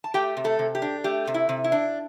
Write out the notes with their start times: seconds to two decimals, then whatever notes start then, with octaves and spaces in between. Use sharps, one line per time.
0.04 A5
0.14 A3 G4 G5
0.37 C3
0.44 A3 A4
0.59 C3
0.75 G4
0.82 D4
1.04 A3 G4
1.27 C3
1.34 E4
1.49 C3
1.64 E4
1.72 D4